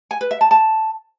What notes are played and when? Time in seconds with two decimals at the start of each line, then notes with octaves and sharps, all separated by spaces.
0.11 G#5
0.21 B4
0.31 E5
0.41 A5
0.51 A5